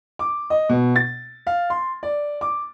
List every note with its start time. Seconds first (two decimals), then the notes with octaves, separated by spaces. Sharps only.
0.19 D6
0.50 D#5
0.69 B2
0.96 A6
1.47 F5
1.70 C6
2.03 D5
2.41 D6